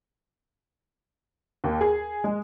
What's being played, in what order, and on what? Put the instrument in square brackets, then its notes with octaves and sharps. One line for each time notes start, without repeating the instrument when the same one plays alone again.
[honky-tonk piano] D#2
G#4
G#3